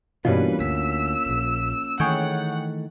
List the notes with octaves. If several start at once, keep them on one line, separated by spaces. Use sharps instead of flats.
G2 B2 E3 A#3 C#4 F4 B4
D2 E6 B6
D1 A#1
D#3 E3 A3 G#4 C#5 F#5 G5